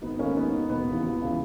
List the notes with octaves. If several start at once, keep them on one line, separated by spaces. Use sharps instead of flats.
G#1 B3 D#4
G#2 D#3 A#3 C#4
D#2 B3 D#4
D#3
E1 B3
D#2 C#3 E3
C#2
C#3 E3